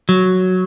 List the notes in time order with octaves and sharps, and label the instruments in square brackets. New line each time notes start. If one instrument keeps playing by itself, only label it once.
[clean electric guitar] F#3